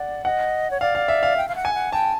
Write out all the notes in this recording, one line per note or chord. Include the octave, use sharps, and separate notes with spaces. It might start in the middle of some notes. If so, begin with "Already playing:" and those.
Already playing: D5 F#5
D#5 F#5
C#5
D5 F5
F5
E5
F5
G5
F5
F#5
G#5
F#5
G5 A5